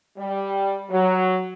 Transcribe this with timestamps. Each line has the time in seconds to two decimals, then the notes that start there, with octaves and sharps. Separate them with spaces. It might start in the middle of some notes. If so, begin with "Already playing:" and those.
0.18 G3
0.90 F#3